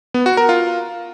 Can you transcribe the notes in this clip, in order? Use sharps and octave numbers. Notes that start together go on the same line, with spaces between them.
B3
F#4
A#4
F4